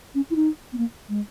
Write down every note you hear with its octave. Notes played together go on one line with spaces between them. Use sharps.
C#4
E4
D#4
B3
A#3
G#3